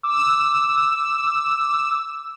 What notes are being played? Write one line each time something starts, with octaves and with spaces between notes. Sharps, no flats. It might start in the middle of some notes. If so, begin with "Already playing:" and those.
D6 E6